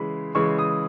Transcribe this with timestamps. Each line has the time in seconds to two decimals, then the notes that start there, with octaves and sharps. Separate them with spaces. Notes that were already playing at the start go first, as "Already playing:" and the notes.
Already playing: C#3 E3 G#3 B5
0.35 C#3 E3 G#3 C#6
0.58 D#6